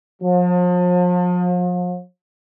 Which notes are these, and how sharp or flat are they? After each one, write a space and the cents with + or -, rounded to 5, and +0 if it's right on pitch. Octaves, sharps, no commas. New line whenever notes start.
F3 +40